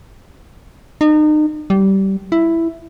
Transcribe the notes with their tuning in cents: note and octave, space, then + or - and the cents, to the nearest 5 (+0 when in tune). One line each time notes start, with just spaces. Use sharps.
D#4 -35
G3 -20
E4 +5